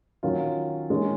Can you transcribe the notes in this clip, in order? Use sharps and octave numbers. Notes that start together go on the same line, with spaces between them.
D#3 F#3 C#4 F4
D#3 G#3 C#4